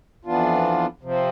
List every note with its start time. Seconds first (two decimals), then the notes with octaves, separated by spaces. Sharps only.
0.25 F2 E3 B3 D4 F4
1.01 C3 F3 C4